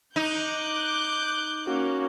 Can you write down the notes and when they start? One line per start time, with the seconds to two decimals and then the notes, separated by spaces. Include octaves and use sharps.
0.16 D#4 D6 F#6 G6
1.67 A#3 C#4 F#4